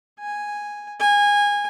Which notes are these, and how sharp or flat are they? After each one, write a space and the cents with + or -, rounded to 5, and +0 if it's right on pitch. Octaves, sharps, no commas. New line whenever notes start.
G#5 -5
G#5 -20